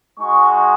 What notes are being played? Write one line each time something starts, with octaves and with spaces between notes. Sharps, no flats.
G#3 D#4 F#4 C#6